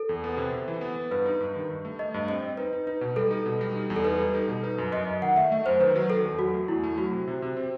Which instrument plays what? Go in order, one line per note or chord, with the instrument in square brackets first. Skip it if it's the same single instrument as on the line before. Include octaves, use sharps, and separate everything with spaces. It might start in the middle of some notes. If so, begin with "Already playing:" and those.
Already playing: [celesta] A4
[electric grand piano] E2
B3
C3
C3
E3
B3
B3
[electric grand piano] G2 [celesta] B4
[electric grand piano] D#4
G2
D#3
G2
A3
[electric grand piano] A3 [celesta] D#5
[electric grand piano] G2
[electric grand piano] C4 [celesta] D#5
[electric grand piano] C4
[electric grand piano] D#4 [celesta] B4
[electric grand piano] D#4
[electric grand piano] D#4 [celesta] B4
[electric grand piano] B2
[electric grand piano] G3 [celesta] A4
[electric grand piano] D#4
B2
G3
D#4
E2
[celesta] A4
[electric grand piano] D#4 [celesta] B4
[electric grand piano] G3
[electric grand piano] D#4 [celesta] A4
[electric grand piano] B2
[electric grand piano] D#4 [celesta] B4
[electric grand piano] F#2
[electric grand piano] F#2 [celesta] D#5
[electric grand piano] F#2
[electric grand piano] D#3 [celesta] F#5
[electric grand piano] A3 [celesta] E5
[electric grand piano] A3
[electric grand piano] F#2 [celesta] C5
[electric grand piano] D#3 [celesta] B4
[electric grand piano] F#3
[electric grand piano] D#3 [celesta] A4
[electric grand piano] E2
[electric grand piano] F#3 [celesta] F#4
[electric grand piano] A3
[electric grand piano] E2 [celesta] E4
[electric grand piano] A3
[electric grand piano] F#3 [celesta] F#4
[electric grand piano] C3
C3
C3
C4